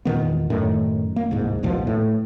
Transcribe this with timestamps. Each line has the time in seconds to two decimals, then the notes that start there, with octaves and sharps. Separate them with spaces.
0.05 E1 A#2 D#3 B3
0.50 F#2 A2 D#3
1.16 A#3
1.31 D1 C2 G#2
1.63 A#1 D#2 B2 F3
1.87 A2